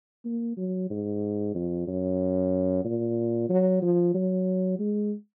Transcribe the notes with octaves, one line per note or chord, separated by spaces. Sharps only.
A#3
F#3
G#2
F2
F#2
A#2
F#3
F3
F#3
G#3